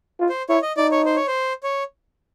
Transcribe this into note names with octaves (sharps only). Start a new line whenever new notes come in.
F4
C5
E4 C#5
D#5
D#4 D5
C#5
C5
C#5
C5
C#5